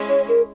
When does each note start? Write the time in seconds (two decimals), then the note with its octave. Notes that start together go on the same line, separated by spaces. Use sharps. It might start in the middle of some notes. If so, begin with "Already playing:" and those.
Already playing: G#3 C#4 E4
0.09 C#5
0.29 A#4